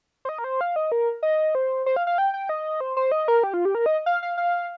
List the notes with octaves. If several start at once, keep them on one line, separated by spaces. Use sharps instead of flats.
C5
D#5
A#4
C5
F5
D#5
A#4
D#5
C5
C5
F5
F5
G5
G5
D#5
C5
C5
D#5
A#4
G4
F4
G4
A#4
D#5
F5
F5
F5